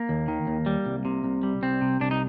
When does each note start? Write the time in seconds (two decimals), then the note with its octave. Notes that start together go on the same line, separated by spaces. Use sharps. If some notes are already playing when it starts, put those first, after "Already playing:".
Already playing: A#3
0.09 D#2
0.28 D#3
0.47 D#2
0.66 G3
0.86 C2
1.05 C3
1.24 C2
1.43 G3
1.62 C2 C4
1.81 C3
2.00 C2 D4
2.11 D#4